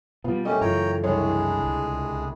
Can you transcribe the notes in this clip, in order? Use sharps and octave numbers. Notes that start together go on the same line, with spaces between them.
B2 G3 B3 F4
A3 A#3 C#4 G4 D#5 E5
F#2 C#3 E3 F4 C#5 G5 A#5
C2 G#3 D4 G#4 C#5 C6 C7
C#2